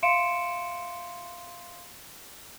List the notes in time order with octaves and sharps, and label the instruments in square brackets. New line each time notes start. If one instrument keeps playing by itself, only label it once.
[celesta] E5 F5 C6 C#7 D7 E7